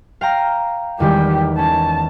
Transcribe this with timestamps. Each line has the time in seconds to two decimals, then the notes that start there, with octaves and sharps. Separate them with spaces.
0.21 F5 G5 A#5
1.00 E2 D#3 G3 G#3 G4
1.59 C#4 A5